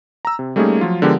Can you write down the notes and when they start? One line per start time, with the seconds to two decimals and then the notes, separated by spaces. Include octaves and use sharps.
0.25 A#5 E6
0.39 C3
0.56 G3 A3 A#3 C#4 D#4 G#4
0.81 F3 F#3 F4
1.02 D3 F3 G#3 B3 G4 A#4